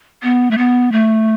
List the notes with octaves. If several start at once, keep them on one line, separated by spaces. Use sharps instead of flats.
B3
A3
B3
A3